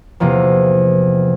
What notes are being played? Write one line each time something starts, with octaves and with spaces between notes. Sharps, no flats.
E2 C3 F3 A#3